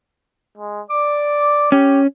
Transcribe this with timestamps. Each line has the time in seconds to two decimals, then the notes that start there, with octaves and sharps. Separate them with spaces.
0.58 G#3
0.90 D5 D6
1.72 C#4 G4